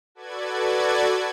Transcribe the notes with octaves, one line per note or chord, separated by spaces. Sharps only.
F#4 A4 B4 D5 G#6